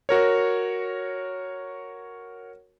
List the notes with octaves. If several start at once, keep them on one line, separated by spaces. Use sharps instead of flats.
F#4 A#4 C#5